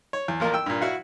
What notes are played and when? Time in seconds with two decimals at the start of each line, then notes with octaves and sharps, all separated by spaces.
0.13 C#5
0.28 E2
0.40 A1 F3 A#3 F4 A#4
0.54 G5 E6
0.66 G2 A#2
0.81 E4 F#4 F5 F#5